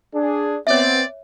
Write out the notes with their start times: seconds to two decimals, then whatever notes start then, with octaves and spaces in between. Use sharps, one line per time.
0.14 D4 G#4
0.67 B3 C4 C#5 D5 E5